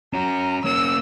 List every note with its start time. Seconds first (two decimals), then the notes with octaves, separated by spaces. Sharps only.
0.14 C#4 F#4 A#5
0.65 A#3 C#4 E6